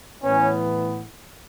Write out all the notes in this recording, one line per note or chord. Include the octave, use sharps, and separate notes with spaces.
A2 E3 B3 C#4